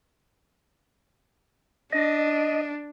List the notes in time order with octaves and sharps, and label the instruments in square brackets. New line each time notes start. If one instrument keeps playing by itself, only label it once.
[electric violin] D4 [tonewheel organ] D#5